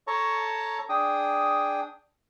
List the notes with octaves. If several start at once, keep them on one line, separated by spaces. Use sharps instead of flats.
A4 C#5 A5 A#5 C#6
D4 G#4 G5 D#6